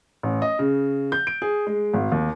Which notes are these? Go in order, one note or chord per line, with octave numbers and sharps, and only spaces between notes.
A1
D#5
C#3
G6
D7
G#4
G#3
G#1
D#2